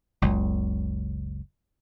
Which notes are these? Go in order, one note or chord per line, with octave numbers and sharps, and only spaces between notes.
F#1 C#2